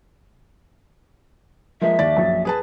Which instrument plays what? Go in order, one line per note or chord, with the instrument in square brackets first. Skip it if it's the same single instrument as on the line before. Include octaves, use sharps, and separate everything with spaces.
[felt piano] F3 G#3 A#3 [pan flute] E5
[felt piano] D#2 D5 A6
A#1 F#2
G#4 B4 A5